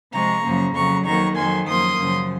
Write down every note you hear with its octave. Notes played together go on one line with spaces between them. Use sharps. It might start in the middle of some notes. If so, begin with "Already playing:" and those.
C3 F3 G#3 A#5 C#6
F#2 C#3 F3 A#3
F2 C#3 F#3 A#5 C#6
F2 D#3 F#3 A#3 A#5 C#6
F2 D#3 F#3 G#5 C6
F#2 F3 A#3 C6 D#6
F#2 C#3 F3